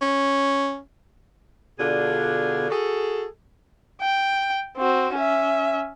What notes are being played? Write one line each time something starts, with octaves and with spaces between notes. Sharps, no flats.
C#4
B2 D3 D4 F4 G#4
F#4 G#4 A4
G5
C4 F#4
C#4 E5